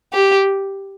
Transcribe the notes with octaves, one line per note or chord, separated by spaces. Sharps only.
G4